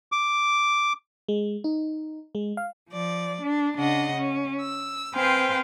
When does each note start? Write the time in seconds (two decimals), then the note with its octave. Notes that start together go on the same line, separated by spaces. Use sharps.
0.12 D6
1.28 G#3
1.64 D#4
2.35 G#3
2.57 F5
2.89 F3 D5
3.42 D4
3.77 C#3 D4 D#5 F#5
4.16 C#4
4.61 E6
5.14 C4 B4 C5 F5 G5 G#5